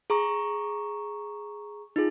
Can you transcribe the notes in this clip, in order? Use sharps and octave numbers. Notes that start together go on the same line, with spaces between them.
G#4 A#5 C#6
D#4 F4 G#4